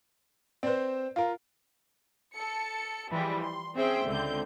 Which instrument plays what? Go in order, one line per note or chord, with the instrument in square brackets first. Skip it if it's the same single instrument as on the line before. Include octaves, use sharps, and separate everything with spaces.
[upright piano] C4 C5 [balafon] B4 D5
[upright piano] F4 A#4 [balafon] F5
[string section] A4 C#7
E3 F3 G3 G#3
C6
C4 C#4 G#4 C5 E5 G5
C#2 D3 C4 G6